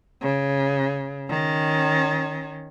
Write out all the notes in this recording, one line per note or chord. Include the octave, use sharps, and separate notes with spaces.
C#3
D#3 C#4